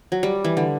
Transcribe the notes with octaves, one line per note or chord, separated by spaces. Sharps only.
F#3
G3
E3
D3